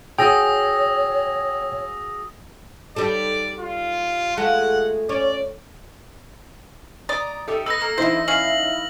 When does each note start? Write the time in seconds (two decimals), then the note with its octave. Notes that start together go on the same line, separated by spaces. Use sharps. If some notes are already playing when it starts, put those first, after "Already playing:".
0.18 F#4 G#4 C#5 G5 D#6 E6 A#6
2.96 G3 D#4 A4 D5
3.59 F4
4.37 G#3 A3 F4 F#5
5.09 C#4 D5
7.09 D5 D#5 A#5
7.48 D#4 G4 A4 E5
7.66 D#4 B4 E6 A#6
7.81 A#3 A#5 F6
7.98 D3 E3 D#4 E4 C5
8.28 C#4 F5 F#7